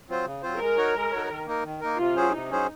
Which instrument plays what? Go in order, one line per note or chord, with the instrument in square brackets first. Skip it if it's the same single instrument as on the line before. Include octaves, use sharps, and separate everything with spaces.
[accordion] F#3 C4 F4 C5
C#3
F#3 C4 F4 C5
[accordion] G#3 [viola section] A#4
[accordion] D#4 F#4 C#5
G#3
D#4 F#4 C#5
D#3
A#3 D#4 A#4
D#3
A#3 D#4 A#4
[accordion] C3 [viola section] F4
[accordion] F#3 C#4 G#4 C5
[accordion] C3 [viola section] D#4
[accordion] F#3 C#4 G#4 C5